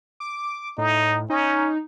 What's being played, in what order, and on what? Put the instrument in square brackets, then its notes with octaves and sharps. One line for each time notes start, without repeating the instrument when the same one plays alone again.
[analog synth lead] D6
[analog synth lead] A2 [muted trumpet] D#4
[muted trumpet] C#4 [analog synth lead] D#4